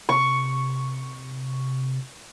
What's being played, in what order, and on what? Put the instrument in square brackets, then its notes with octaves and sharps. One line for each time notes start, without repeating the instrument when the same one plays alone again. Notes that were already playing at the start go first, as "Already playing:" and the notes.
[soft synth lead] C3 [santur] C#6